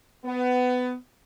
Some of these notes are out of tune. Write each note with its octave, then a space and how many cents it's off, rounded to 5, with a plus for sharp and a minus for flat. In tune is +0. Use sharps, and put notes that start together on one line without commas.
B3 +20